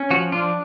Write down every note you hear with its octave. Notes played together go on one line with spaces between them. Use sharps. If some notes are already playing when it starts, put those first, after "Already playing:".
Already playing: C#4
F3 F#4
D4 F4